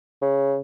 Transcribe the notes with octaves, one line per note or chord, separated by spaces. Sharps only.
C#3